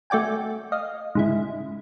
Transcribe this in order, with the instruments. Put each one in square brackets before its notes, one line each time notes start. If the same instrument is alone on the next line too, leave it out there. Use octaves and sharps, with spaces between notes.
[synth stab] A3 F#4 D5 G5 G#5
D#5 F5
G#2 C#3 E4